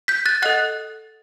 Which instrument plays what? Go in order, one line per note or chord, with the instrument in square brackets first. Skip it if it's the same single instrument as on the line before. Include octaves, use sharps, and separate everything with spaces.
[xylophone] G6 B6
F#6 A6
A4 D#5 F#5 F#6 A6